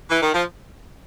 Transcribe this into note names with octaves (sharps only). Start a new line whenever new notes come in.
E3
D#3
F3